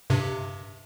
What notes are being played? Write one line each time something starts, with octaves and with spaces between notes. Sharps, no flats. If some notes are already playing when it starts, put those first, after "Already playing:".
G2 C3